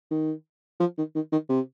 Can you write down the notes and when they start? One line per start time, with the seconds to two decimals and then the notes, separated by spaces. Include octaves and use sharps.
0.11 D#3
0.80 F3
0.98 D#3
1.15 D#3
1.32 D#3
1.49 C3